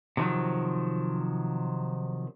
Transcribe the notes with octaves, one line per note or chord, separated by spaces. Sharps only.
C3 D#3 F3 F#3